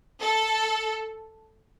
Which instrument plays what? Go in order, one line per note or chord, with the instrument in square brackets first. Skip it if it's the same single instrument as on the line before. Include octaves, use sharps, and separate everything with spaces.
[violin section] A4